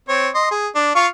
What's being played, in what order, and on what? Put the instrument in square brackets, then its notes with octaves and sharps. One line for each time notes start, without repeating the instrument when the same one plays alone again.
[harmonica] C4 C#5
D#5 C6
G#4
D4
F4 F5 C#6